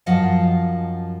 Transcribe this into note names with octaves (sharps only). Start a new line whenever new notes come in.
F#2 F3 D#5 F5 F#5 A5